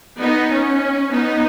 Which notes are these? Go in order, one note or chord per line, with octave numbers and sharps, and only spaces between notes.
B3 D#4
C#4
B3 D#4